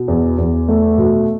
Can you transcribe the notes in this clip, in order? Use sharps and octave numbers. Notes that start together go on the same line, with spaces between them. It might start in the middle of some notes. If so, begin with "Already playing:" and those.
Already playing: B2
E2
E2
A3
B2